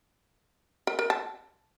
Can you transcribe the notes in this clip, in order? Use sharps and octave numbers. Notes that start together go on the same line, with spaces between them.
A#4
A#4
A5